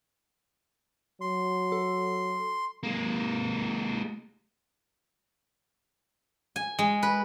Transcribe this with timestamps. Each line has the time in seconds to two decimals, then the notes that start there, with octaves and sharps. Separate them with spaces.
1.21 F#3 C6
1.72 A4
2.83 G#3 A#3
6.56 G#5
6.79 G#3
7.03 B4